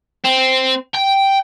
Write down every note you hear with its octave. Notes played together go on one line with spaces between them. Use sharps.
C4
G5